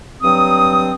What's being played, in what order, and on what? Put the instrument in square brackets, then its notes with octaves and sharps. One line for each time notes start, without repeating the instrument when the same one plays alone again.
[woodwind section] G2 F#3 C4 D#6